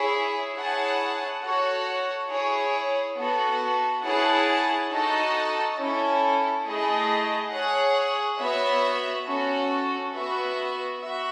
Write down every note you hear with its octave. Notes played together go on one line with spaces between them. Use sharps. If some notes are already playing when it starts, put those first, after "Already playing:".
Already playing: E4 G#4 C#5 E5
E4 G#4 C#5 F#5 A5
F#4 A4 C#5 F#5
E4 G#4 C#5
B3 F#4 A4
E4 G#4 C#5 F#5 A5
D#4 F#4 A4 D#5 A5
C#4 E4 A4
A3 E4 G#4 D#5 A5
G#4 C#5 F#5
B3 F#4 C#5 E5
C#4 F#4 A4
B3 F#4 B4 E5
F#4 E5